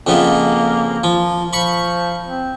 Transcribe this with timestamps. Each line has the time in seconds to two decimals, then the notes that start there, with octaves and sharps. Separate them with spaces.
0.07 F2 C#3 A#3 B3
1.04 F3
1.53 F3 B5 C#6
2.26 C4